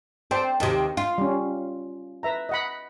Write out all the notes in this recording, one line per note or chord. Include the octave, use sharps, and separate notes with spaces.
C4 D5 G5 A5
D#2 C3 D#5 A5
F4
G3 C#4
B4 E5 A#5
D#5 F#5 B5